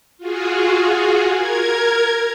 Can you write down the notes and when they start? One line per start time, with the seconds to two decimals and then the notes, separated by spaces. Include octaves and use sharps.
0.18 F4 F#4 G#4
1.34 A#4 G#6